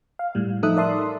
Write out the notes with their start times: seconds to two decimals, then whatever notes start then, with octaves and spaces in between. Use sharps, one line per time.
0.19 F5
0.35 A2 G3
0.63 F3 D#4 A4 E5 D#6 F#6
0.76 A#4 D5 E5 A5 C6 D#6